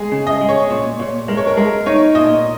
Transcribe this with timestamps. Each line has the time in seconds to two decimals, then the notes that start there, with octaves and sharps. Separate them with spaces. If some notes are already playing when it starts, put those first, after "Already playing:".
Already playing: G#3 G#4
0.12 C#3
0.27 D#5
0.41 G#3
0.49 C#5
0.70 A#2 C#5
0.99 A#2 C#5
1.28 G#3 A#4
1.37 C#5
1.47 A#4
1.57 G#3 A#4
1.86 D#4 C#5
2.15 A#2 D#5